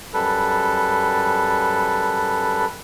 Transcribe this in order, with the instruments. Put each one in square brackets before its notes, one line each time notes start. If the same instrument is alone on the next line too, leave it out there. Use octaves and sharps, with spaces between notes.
[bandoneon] F#2 G3 A4 B4